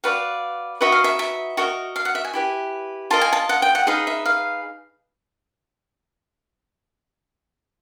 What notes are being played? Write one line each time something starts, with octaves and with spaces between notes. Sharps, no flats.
F#4 B4 D5 F5
D#4 F#4 B4 D#5 E5
F5
E5
E5
F#4 A#4 D#5
F5
F#5
E5
G#5
E4 G4 B4
F4 A#4 D#5 A5
G#5
A5
F#5
G5
F#5
D#4 G#4 B4 F5
E5
F5